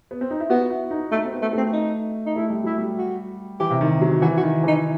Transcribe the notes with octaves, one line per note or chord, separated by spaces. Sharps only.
B3
C4
D#4
E4
B3 F#4
E4
D#4
A3 D#4
C4
B3
A3
A3 C4
D#4
D#4
A3 E4
G3
F#3 E4
G3
F#4
E3 G4
C3
D#3
F#3
E3 F#4
F#4
D#3
E3 D#4